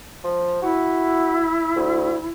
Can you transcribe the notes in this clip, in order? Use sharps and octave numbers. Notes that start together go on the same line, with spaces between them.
F3
E4 F#4
D2